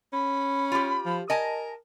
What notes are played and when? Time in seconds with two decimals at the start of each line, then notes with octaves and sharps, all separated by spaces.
0.13 C#4 B5
0.72 F4 G4
1.05 F3
1.30 A#4 D#5 G#5 A5